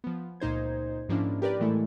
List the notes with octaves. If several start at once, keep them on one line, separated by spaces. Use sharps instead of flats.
F3 B3
C#2 A#2 D#4 C5 G#6
G#2 F3 A#3 C#4 D4 E4
G4 A#4 B4 D5
A2 E3 G#3 A3 E4 A4